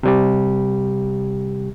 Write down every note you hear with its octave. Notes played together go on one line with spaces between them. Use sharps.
C3 G3 G4